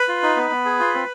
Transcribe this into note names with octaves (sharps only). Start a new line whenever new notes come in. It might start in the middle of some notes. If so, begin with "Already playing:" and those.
Already playing: B4 B5
F4
D#4
B3
B3
G#4
F4
C4